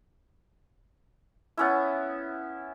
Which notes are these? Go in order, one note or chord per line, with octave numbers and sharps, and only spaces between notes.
B3 C#4 E4